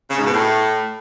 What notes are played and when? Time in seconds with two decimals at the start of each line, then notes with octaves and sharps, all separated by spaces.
0.10 C#3
0.18 G#2
0.25 B2
0.33 A2